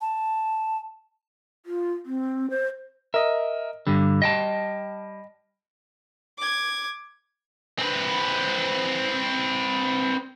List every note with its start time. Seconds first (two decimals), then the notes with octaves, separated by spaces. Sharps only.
0.01 A5
1.66 F4
2.06 C4
2.50 C5
3.14 A#4 D#5 E5
3.87 G2 D3 G3
4.22 D#5 G5 A5
6.38 D6 G#6
7.79 C4 B4